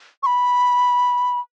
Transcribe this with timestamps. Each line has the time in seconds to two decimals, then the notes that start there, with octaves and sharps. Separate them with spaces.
0.23 C#6
0.26 B5